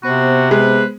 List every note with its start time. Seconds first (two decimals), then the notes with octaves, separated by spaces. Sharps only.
0.03 C3 B3 F#4 C5
0.51 G#3 B4